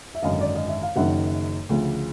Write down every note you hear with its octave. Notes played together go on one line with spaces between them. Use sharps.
E5
G#1 F#2 D3 D#5 F5
D5
D#5
E5
F5
F#1 F#2 D#3 E5 F#5
D2 C#3 F3